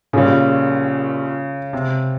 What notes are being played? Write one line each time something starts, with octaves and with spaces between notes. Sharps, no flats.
A#1 A#2 C#3 G3
C3